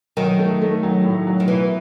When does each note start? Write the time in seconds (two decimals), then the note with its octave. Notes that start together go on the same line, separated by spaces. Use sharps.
0.17 D#3 F#3
0.39 A3
0.61 A3
0.83 F#3
1.04 A2
1.27 F#3
1.40 D#3
1.48 E3 B3